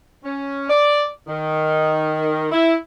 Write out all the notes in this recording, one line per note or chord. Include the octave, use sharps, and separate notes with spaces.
C#4
D5
D#3
E4